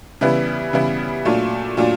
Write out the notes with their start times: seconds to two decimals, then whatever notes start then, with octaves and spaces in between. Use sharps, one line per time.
0.21 C#3 E3 G3 B3 E4
0.73 C#3 E3 G3 B3 E4
1.25 A#2 F#3 A3 D4 F4
1.77 A#2 F#3 A3 D4 F4